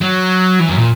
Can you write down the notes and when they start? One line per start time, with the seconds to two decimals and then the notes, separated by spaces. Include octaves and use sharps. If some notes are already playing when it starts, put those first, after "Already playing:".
0.02 F#3
0.60 E3
0.69 F#2
0.78 A#2